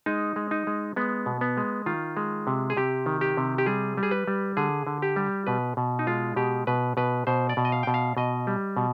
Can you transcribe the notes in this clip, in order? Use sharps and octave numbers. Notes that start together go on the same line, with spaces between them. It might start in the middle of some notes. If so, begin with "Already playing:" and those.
G#3 D#4
G#3
D#4
G#3
G#3 B3
B2
B3
G#3
D#3 F4
G#3
C3
G#4
C3 G4
D#3
G4
C3
G4
G3 G#4
G3
G#4
B4
G3
D3 G#4
D3
G4
G3
B2 B4
B2
D#4
G#3 F4
B2 G4
B2 B4
B2 B4
B2 C5
D5
B2
D#5
F5
B2 G5
F5
B2 D#5
G3
B2